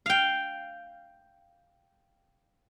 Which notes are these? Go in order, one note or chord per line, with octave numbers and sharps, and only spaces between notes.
F5 G5